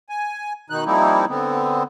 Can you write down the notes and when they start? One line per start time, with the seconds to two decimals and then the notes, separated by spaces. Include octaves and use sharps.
0.09 G#5
0.70 B2 D#3 D#4 F#6
0.86 F3 G3 A#3 C4 D#4 E4
1.29 D3 B3 C4